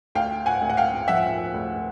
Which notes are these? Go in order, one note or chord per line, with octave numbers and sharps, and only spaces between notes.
D2 F5 G5
F#5 G#5
D2
F#5
F5 G5
F3 E5 F#5
D2